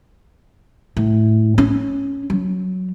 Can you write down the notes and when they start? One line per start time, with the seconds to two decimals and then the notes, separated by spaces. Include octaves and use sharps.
0.97 A2
1.58 C#4
2.30 F#3